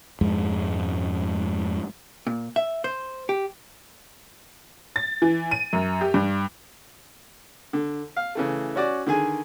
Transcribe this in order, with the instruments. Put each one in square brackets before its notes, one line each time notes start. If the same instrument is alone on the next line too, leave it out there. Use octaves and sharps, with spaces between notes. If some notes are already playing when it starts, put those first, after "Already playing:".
[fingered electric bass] F2 G#2 G#3
[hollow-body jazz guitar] A#2
E5
C5
G4
[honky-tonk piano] A6
E3
D#7
F#2
G4
G2
[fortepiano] D3
F5
C#3 E3 A3
C#4 F#4 D5
D3 D#3 G#4 G#5